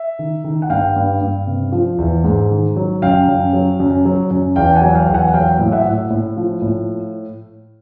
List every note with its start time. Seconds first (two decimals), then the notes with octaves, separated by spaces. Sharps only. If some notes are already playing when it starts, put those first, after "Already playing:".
Already playing: E5
0.19 D#3
0.44 D#3
0.62 F#5
0.70 G2 F5 G5
0.96 G2
1.21 G2
1.47 C3
1.72 F3
1.98 E2
2.24 G#2
2.51 D#3
2.76 F#3
3.02 F#2 F5 G5
3.28 F#2
3.53 F#3
3.80 F#2
4.05 F#3
4.30 F#2
4.56 E2 F5 G5
4.75 F#5 G#5
4.82 F#3
4.95 F5 G5
5.08 E2
5.14 F#5 G#5
5.34 F#3 F5 G5
5.59 A2
5.72 E5 F#5
5.85 A2
6.10 A2
6.37 F3
6.62 A2